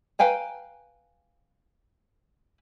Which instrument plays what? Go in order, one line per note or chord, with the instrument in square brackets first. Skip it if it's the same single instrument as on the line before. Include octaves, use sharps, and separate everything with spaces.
[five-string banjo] B4 F5 G5 G#5 A#5